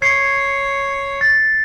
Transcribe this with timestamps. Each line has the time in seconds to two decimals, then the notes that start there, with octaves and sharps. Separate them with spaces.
0.02 C#5 G#6 C7 C#7
1.21 A6